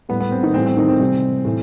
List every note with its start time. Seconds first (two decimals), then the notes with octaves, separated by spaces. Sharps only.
0.09 A2 G3 B3
0.20 B3
0.32 C4
0.43 D#3 D#4
0.54 A2 E3 G3 C4
0.66 C4
0.77 D#3 D#4
0.88 C4
0.99 C3 E3 G3
1.45 A2 E3